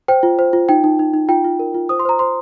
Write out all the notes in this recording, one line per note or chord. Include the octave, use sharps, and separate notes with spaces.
C5 G5
F4
C5
F4
D#4 G5
D#4
D#4
D#4
F4 G5
F4
A#4
F4
C5 D#6
C6
C5 A#5
C5 C6